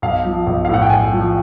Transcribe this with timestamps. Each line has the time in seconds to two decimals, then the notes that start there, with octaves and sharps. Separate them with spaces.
0.02 B1 F5
0.25 F3
0.46 B1
0.65 F5
0.69 A2 F#5
0.82 G5
0.90 B1 G#5
1.12 F3